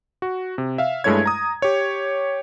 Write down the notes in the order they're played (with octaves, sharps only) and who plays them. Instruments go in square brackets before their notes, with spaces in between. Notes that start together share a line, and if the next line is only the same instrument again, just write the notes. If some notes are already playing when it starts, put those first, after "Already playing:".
[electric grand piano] F#4
C3
E5 F5
G2 G#3 A3 E4 C#5 G#6
A#5 D#6
G4 C#5